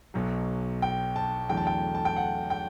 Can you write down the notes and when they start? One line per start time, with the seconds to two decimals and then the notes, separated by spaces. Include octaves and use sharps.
0.14 B1 B2 F#3
0.82 G5
1.16 A5
1.49 E2 D3 F#3 A3 G5
1.57 A5
1.67 G5
1.95 A5
2.05 G5
2.16 F#5
2.50 G5